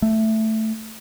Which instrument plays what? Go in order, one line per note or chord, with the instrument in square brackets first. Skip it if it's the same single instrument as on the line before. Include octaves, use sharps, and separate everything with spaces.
[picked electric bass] A3